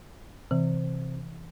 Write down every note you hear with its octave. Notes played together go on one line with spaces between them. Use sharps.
C3 E3